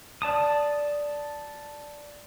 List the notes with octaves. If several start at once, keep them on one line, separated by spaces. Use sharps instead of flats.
D5 A5 D#6